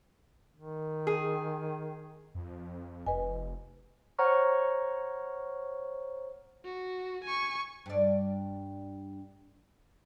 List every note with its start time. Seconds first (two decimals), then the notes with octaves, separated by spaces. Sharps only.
0.57 D#3
1.07 G#4
2.35 F2
3.07 F1 B4 D#5 G#5
4.19 C5 C#5 F#5 A#5 C#6 F6
6.65 F#4
7.23 G#5 C#6
7.86 G2 D5